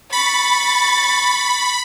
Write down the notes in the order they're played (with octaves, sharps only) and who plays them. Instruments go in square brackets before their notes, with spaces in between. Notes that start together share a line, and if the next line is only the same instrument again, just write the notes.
[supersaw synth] B5 [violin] C#6 A6